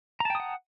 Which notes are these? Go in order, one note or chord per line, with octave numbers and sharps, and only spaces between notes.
F#5 G5 A5 A#5 D#6